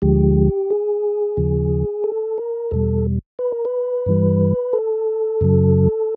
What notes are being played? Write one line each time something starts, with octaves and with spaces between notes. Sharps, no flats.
D2 D3 F3 G#3 G4
G#4
D#2 C#3 F3
A4
A#4
E2 B2 G3 A4
B4
A#4
B4
G2 E3 G3
A4
F#2 C#3 F#3